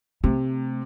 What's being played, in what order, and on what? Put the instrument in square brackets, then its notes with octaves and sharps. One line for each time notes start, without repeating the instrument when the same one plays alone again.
[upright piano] C3 [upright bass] A3